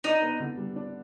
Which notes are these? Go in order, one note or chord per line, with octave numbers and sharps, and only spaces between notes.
D4 D#4
B3
D3
G3
D4